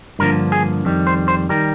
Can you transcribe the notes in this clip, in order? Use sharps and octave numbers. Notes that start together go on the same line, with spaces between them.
G2 D3 F3 A#3 A#4
G#4
F2 D#3 G3
C5
C5
D#3 G3 A#4